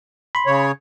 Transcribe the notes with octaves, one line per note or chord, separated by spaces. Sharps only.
B5 C6
C#3 C#5